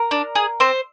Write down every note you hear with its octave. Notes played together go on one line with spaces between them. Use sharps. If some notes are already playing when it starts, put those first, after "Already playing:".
Already playing: A#4
D4
G#4
C4 C5